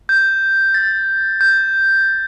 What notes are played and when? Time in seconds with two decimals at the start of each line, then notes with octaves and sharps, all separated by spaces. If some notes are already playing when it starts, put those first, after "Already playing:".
0.09 G6
0.74 A6
1.41 G6